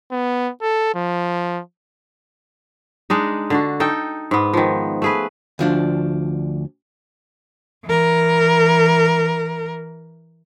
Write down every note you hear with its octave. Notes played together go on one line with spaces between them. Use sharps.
B3
A4
F3
G#3 D4 D#4
D3 D4 F#4
D#4 A4 G5
G#2 B3
D#3 F3
A3 G#4 B4
D2 F3 D4
E3 A#4